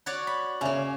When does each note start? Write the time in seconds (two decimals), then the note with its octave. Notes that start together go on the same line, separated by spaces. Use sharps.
0.06 F#4 C#5 D5
0.27 B5
0.61 C#3 A#3 C#5 E5 G#5